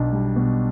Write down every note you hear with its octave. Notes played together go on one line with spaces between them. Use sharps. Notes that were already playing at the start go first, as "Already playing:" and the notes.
Already playing: B1 B2 D4
G3
B2